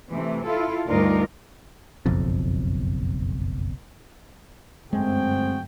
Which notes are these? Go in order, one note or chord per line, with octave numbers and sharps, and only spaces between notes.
C3 E3 A3
E4 F4 A4
D2 G2 D#4 F4 A#4 D5
F#1 B1 F2
G1 F#2 G#3 A3 C4 F#4 G#4 G5